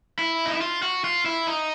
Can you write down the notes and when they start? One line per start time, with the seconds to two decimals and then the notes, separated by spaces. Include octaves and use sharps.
0.19 E4
0.46 D#4
0.54 E4
0.61 F4
0.83 F#4
1.04 F4
1.26 E4
1.47 D#4